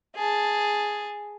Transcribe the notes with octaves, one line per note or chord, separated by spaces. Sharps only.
G#4 A5